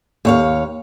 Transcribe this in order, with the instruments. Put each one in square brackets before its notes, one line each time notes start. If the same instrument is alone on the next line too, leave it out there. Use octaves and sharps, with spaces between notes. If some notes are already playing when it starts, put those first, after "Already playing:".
[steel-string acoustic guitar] D#2 C#5 F5